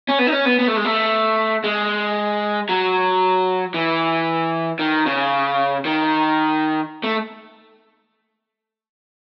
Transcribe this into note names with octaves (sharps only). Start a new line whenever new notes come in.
C#4
B3
D#4
C#4
B3
B3
A3
G#3
A3
G#3
F#3
E3
D#3
C#3
D#3
A3